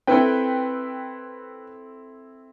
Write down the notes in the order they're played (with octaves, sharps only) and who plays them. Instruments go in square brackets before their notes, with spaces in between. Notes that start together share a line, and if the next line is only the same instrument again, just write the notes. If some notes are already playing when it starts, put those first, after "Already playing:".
[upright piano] C4 E4 A4 [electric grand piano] B4 G5